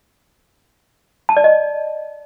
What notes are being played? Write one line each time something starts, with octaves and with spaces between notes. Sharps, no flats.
A5
D5
D#5